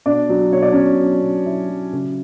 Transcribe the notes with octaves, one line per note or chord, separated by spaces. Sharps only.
B2 D4 D5
F#3
B2 C#5
D5
B2 C#4 C#5
F#3
B2
F#3 E4 E5
F#3
C#3